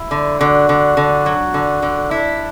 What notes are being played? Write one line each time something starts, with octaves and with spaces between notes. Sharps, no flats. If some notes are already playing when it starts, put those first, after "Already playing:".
Already playing: E4
D3
D3 F#4
D3
D3
F#3
D3
D3
D4 E4